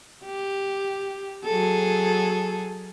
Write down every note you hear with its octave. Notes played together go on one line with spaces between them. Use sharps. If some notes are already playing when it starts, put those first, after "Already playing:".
G4
F#3 G#4 A4